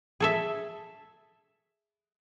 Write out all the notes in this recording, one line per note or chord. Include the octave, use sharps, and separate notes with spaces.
G#4 A4 E5